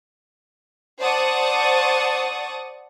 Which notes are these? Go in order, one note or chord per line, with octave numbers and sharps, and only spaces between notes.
C5 D5 F#5 A5 C#6 D#6